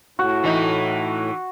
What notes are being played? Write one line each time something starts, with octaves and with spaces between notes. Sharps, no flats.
A2 F#4
E3 D#4